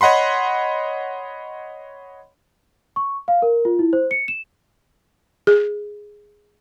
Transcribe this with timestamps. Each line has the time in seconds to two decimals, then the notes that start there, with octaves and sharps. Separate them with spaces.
0.01 C#5 D#5 F#5 B5 C6
2.96 C#6
3.28 F5
3.42 A#4
3.65 F4
3.79 E4
3.93 C5
4.11 C#7
4.28 E7
5.47 G#4